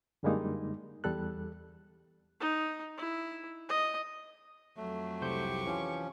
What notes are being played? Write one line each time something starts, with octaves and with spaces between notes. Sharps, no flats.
F#2 D3 G3 G#3 A#3 D#4
E2 G3 A4 F#6
D#4
E4
D#5
F2 F#3 A3
C2 G4 C5 C#6 G6
E3 F3 C#4